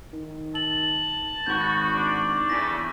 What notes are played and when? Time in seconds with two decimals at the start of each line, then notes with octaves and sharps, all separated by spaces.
0.13 D#3
0.55 A5 F#7
1.47 G#1 B3 F#4 C#6 G6
1.93 D4
2.49 E2 C#3 G3 A3 A#6 B6